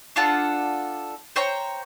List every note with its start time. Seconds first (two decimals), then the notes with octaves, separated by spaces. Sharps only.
0.16 D4 F4 A4 F#5
1.36 C5 C#5 G5 A#5